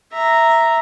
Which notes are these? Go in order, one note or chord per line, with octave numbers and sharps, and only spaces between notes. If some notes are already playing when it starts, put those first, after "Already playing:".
E5 A#5